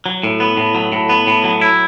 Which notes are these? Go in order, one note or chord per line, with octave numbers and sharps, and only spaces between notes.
F#3
A2
B3
A2
F#3
A2
B3
A2
F#3
E4